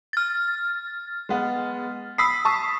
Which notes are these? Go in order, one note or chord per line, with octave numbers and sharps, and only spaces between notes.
F6 A6
G#3 B3
B5 D#6 E6 B6 C7
A5 C#6 D#6